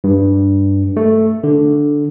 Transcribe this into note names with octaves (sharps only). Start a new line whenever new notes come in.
G2
A3
D3